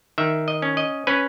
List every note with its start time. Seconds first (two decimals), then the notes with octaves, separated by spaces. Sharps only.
0.18 D#3 E5
0.48 D#5
0.62 C#4
0.77 D#5
1.07 C#4 B4